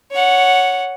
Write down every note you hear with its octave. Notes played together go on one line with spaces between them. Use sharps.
C#5 F#5